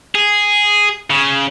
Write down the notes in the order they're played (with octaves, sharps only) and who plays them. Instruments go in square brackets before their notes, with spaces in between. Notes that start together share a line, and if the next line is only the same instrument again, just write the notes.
[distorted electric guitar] G#4
C#3